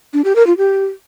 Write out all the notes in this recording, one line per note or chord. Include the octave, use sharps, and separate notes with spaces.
D4
G4
A#4
F4
G4